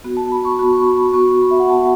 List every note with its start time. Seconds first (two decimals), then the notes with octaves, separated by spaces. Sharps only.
0.04 B3 F#4
0.17 A5
0.32 B5
0.45 C#6
0.59 B3 F#4 B5
0.73 C#6
0.87 B5
1.13 B3 F#4 C#6
1.42 B5
1.51 E5
1.60 F#5
1.69 B3 F#4 A5